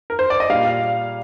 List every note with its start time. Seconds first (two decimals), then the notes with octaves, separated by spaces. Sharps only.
0.10 A#4
0.19 C5
0.30 D5
0.40 D#5
0.50 A#2 G3 F5